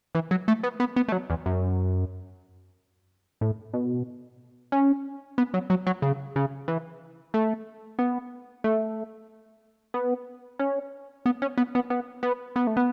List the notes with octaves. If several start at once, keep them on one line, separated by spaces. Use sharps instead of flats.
E3
F#3
A3
B3
B3
B3
A3
F#3
E2
F#2
A2
B2
C#4
B3
F#3
F#3
F#3
C#3
C#3
E3
A3
B3
A3
B3
C#4
B3
C#4
B3
B3
B3
B3
B3
A3
B3